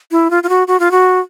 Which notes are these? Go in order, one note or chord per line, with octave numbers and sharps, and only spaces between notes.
E4
F4
F4
F#4
F#4
F4
F#4